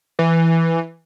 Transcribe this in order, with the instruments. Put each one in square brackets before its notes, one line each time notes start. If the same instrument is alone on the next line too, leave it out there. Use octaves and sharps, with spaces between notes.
[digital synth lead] E3